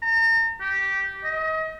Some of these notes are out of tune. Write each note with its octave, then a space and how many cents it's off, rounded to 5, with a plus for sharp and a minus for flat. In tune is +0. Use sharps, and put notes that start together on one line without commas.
A#5 -40
G4 -10
D#5 +30